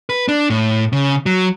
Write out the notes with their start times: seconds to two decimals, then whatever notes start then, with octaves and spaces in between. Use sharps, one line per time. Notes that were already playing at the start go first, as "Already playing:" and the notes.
0.10 B4
0.28 D4
0.50 A2
0.93 C#3
1.26 F#3